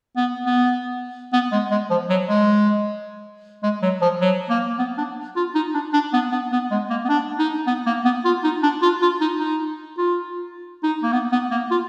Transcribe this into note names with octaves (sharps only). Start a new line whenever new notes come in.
B3
B3
B3
G#3
G#3
F3
F#3
G#3
G#3
F#3
F3
F#3
A#3
B3
D4
F4
D#4
D4
D4
B3
B3
B3
G#3
A#3
B3
D4
D#4
B3
A#3
B3
F4
D#4
D4
F4
F4
D#4
D#4
F4
D#4
A#3
B3
B3
A#3
F4